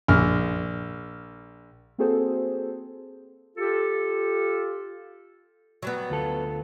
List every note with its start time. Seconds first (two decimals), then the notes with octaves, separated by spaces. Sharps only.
0.08 A#1 F6
1.98 A#3 C4 F#4 G#4 A4 C5
3.57 F4 G4 A4
5.82 F#3 G3 B3
6.10 D2 F4 A4